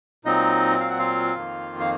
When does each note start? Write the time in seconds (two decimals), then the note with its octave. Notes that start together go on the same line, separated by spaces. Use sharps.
0.25 A#2 F#3 C4 D#4 D#5
0.80 F5
0.90 F#5
0.99 F4 F5
1.36 F2 D#3 A#3
1.79 F5